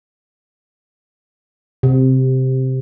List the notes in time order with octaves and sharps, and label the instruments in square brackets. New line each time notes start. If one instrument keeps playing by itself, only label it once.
[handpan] C3